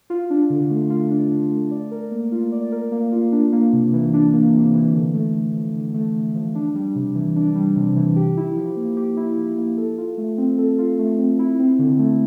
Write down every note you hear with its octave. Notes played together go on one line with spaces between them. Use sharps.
F4
D4
D3
A3
F4
D4
D3
A3
D5
A#4
A#3
F4
D5
A#4
A#3
F4
D4
A#3
C3
E3
D4
A#3
C3
E3
D3
A3
D3
F3
D3
A3
D3
F3
D4
G3
C3
E3
D4
G3
C3
E3
G4
E4
F3
A#3
G4
E4
F3
A#3
A4
F4
A3
C4
A4
F4
A3
C4
E4
C4
D3
A3